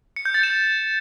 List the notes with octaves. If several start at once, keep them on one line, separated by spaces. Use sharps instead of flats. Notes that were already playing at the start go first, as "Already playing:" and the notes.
C#7
G6
A6
E7